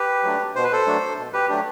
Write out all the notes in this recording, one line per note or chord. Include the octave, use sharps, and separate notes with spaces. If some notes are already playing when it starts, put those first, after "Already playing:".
Already playing: G4 B4
F#3 A3 D4
B2 C5
B4
A4 C5
F#3 A3 D4
B2
G4 B4
F#3 A3 D4 G4